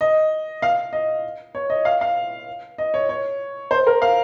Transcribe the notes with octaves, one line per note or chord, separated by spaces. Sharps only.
D#5
F5
D#5
C#5
D#5
F5
F5
D#5
C#5
C#5
C5
A#4
F5